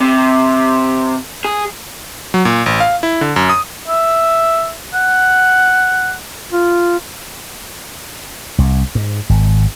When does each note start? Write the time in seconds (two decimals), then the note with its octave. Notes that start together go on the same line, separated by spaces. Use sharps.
0.01 C3
1.45 G#4
2.34 F#3
2.45 A#2
2.66 A1
2.80 F5
3.03 E4
3.21 D3
3.36 F#2
3.49 D#6
3.88 E5
4.94 F#5
6.52 F4
8.58 C2
8.95 G#2
9.30 G#1